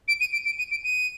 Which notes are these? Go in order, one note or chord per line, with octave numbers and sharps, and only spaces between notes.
D7
D#7
D7
D7
D#7
D7
D#7